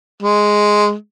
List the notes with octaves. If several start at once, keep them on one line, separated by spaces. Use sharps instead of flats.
G#3